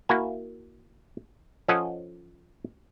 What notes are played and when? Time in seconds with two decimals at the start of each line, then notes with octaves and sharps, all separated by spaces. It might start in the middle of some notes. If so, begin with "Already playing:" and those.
0.09 A#3 E4 F#4 F#5 G#5
1.68 F3 C#4 A4 D#5 F#5